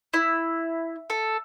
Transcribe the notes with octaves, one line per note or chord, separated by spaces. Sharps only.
E4
A4